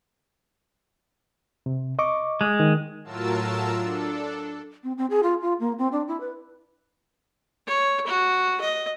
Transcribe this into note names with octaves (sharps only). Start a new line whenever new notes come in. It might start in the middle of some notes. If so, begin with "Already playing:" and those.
C3
D#5 C#6 D6
G#3
D#3
A2 F#3 F4 A#4 A5 E6
D4 A4
C4
C4
G#4
F4
F4
A#3
C4
D4
E4
B4
C#5
F#4
D#5